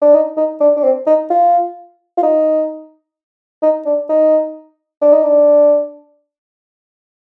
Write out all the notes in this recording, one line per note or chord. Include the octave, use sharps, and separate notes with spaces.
D4
D#4
D#4
D4
D4
C4
D#4
F4
F4
D#4
D#4
D4
D#4
D4
D#4
D4